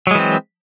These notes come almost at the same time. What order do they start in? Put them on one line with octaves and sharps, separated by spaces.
F#3 G#3 E3 C4